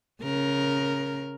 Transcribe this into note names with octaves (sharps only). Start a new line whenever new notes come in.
C#3 A#4